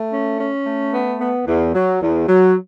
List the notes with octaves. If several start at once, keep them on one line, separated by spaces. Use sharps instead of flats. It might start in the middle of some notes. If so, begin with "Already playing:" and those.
Already playing: A3
C#4
C#4
A3
B3
B3
E2
F#3
E2
F#3